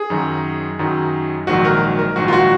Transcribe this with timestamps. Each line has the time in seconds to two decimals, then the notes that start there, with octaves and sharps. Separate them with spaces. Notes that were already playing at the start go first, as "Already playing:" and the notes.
Already playing: G#4
0.10 F#2 D#3 F#3
0.79 F#2 D#3 F#3
1.47 A#1 G#2 D#3 F#3 F#4
1.65 A#4
1.99 A#4
2.16 A#1 G#2 D#3 F#3 F#4
2.28 F4
2.33 F#4